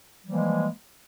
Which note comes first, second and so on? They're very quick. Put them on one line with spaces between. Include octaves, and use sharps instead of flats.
G3 F3 E3 A#3 G#3